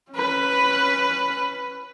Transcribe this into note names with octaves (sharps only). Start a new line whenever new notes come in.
C#4 B4